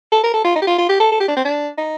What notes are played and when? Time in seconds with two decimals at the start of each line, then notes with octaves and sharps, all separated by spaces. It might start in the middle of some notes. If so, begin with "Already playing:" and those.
0.12 A4
0.24 A#4
0.34 A4
0.45 F4
0.56 D#4
0.62 G4
0.67 F4
0.78 F4
0.89 G4
1.00 A4
1.12 A4
1.20 G4
1.28 D4
1.37 C4
1.45 D4
1.78 D#4